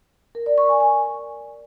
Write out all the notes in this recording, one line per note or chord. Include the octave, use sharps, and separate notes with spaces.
A#4
D5
C#6
G#5
G#5